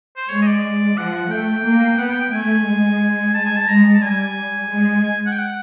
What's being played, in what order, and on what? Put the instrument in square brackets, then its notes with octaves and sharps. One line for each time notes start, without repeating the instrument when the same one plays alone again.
[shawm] C5
[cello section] G#3 [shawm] C#5
[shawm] D#5
D5
[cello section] F3 [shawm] F#5
[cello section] A3 [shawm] G5
[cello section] A#3
[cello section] B3 [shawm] F#5
[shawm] G5
G5
[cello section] A3 [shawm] G#5
[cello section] G#3
[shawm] A5
G#5
A5
[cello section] G#3 [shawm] A#5
[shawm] A5
[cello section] G3 [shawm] G#5
[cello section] G#3
[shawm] G#5
F#5
G5
F#5